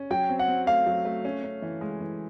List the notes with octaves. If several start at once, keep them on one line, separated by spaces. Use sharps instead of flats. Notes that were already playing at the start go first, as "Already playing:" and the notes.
Already playing: C#4
F#3 G5
C4
F#5
C4
A3 F5
F#3
A3
C#4
C#4
E3
G#3
E3